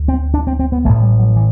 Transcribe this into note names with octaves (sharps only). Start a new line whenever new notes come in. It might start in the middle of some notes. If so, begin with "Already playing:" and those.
Already playing: D2
C4
D4
C4
C4
B3
A1 A2 A3
G3
F#3
E3